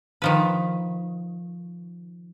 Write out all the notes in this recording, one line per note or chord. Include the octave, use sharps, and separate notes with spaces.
D#3 F3 B4